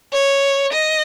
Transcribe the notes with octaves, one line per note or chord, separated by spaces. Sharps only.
C#5
D#5